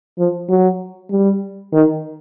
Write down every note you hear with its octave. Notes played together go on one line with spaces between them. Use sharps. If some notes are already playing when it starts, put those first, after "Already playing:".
F3
F#3
G3
D#3